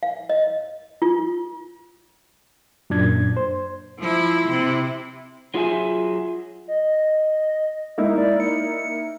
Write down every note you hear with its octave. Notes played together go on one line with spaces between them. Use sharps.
F5
D#5
F4
F#2 A#2 D4 G#6
C5
F3 E4
C3 E4
F#3 F4 G#4 E5 G#5
D#5
G#3 A#3 D#4 E4
D5
C#7